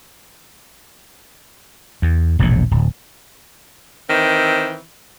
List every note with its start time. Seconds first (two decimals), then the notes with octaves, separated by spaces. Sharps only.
2.02 E2
2.39 E1 A#1 E2 A2
2.71 D1
4.09 D#3 E3 C4